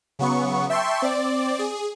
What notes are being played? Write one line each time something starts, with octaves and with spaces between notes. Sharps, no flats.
C#3 F#3 B3 C#6
E5 G5 A5 C6 C#6
C4 D5
G#4